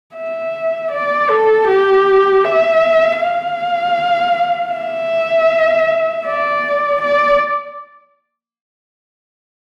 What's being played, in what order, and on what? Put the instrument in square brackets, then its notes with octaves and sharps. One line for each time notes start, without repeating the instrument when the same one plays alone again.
[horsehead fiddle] E5
D5
A4
G4
E5
F5
E5
D5
D5